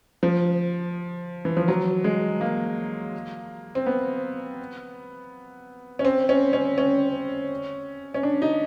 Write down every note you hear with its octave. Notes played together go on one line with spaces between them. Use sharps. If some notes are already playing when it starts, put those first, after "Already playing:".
F3
E3
F3
F#3
G#3
A#3
C4
B3
C#4
C4
C#4
C#4
C#4
C#4
D4
D#4